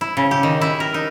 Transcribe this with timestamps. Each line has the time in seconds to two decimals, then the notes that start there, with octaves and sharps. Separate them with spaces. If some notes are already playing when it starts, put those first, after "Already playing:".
0.01 E4
0.17 C#3
0.31 G4
0.43 D#3
0.61 E4
0.80 A#4
0.94 D#4